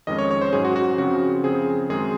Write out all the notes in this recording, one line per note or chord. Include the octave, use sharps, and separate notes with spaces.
F2 D#3 G#3 C#4 D#5
C#5
C#5
C5
G#2 F#3 C#4 G#4
F#4
F#4
F#2 C#3 F3 C4 F#4
C#3 F3 C4 G#4
F#2 D#3 G#3 C4 G#4